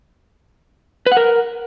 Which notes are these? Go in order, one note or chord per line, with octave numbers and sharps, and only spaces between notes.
B4
F#5
A#4